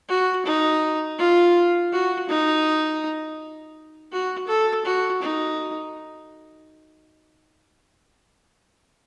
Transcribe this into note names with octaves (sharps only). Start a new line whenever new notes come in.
F#4
D#4
F4
F#4
D#4
F#4
A4
F#4
D#4